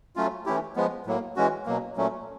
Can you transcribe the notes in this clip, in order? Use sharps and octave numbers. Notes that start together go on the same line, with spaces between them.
F#3 A3 C#4 F4
E3 A3 C#4 E4 G4
F3 G#3 B3
A2 F#3 A#3
E3 G#3 C#4 F#4
B2 F#3 A#3
A#2 F#3 A3 C#4